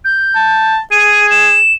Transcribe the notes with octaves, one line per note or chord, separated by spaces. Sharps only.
G6
A5
G#4 D#7
E7